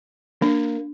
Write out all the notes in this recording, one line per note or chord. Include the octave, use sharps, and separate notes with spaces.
A#3 D4